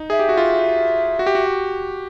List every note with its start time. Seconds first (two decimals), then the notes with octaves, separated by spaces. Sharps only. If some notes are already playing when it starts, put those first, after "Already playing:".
Already playing: D#4
0.10 G#4 E5
0.19 G4
0.29 F#4
0.37 F4
1.19 F#4
1.26 G4
1.35 F#4